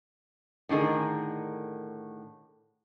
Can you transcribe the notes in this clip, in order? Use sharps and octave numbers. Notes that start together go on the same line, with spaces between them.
A2 D3 D#3 G#4 A#4